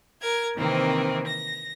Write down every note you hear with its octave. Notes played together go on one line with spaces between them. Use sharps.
A#4 G#6
C3 D#3 E3 A#3 C4
A#6